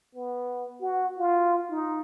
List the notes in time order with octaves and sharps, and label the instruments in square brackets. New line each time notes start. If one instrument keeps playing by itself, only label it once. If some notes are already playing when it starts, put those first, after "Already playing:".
[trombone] B3
F#4
F4
D#4